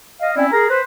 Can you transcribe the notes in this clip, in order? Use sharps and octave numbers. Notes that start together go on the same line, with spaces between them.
D#5 F5
C4 C#4 E4 D5
G#4 A#4 A#5
B4 C5